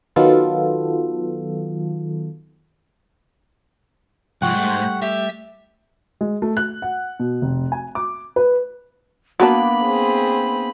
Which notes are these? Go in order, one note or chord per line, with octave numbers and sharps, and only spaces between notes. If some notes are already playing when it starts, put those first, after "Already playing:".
D#3 F#3 B3 F4 A4
C2 G#2 F3 F#5 G5 C#6
G3 A3
G4 E5
G#3
A3
F#6
F#5
B2
F1
G#5
D6
B4
A#3 B3 D4 F#4 A#4 A5 B5
C4 G#4